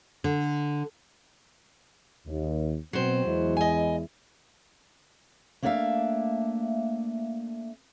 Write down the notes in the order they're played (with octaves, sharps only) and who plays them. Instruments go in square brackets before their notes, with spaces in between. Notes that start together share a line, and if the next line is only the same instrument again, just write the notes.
[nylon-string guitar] D3
[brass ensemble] D#2
[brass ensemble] B2 C4 [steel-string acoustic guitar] F#3 C5
[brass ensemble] E2 G#3 E4
[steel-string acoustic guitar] D#5 G#5
A3 A#3 D4 D5 E5 F5